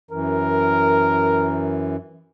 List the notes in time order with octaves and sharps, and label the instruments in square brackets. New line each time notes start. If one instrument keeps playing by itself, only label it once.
[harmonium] F#2 E3 [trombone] A#4